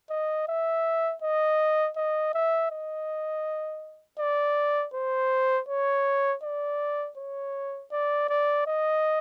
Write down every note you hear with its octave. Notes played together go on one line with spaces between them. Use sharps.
D#5
E5
D#5
D#5
E5
D#5
D5
C5
C#5
D5
C#5
D5
D5
D#5